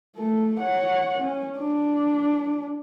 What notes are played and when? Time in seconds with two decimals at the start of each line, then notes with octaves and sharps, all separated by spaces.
0.16 A3 A4
0.59 C#5 F#5
1.19 C#4
1.58 D4